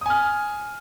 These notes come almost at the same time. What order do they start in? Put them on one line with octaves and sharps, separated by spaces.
D#6 G#5 F6